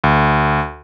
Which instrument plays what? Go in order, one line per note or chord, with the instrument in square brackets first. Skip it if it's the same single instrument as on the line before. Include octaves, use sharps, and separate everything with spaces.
[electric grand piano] D2